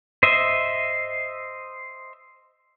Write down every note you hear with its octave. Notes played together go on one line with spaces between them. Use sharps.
C5 D#5 E5